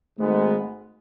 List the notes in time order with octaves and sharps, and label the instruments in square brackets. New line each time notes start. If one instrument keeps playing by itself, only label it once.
[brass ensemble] G#1 G#2 G#3 B3 [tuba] A3